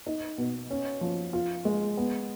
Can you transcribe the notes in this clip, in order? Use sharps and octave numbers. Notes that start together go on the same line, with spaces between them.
D#4
B2
C#4
F3
F4
G#3
B3